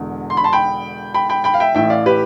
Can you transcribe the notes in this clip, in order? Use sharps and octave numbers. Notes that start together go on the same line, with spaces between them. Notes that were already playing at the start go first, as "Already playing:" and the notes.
Already playing: E1 E2 D3
C6
B5
A5 C6
G5 B5
G5 B5
G5 B5
G5 B5
F5
E5 G5
A1 A2 E3 E5 G5
D5 F5
G4 B4